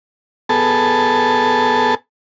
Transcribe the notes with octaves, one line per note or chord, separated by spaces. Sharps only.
B3 G#4 A4 A5